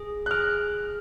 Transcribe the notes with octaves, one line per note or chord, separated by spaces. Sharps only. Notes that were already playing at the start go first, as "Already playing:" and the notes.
Already playing: G#4
F#6
G#4 F6